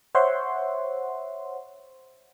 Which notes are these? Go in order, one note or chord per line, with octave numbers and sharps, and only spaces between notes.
C5 C#5 E5 F#5 C6